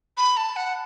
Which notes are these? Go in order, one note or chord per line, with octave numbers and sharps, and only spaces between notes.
B5
A5
F#5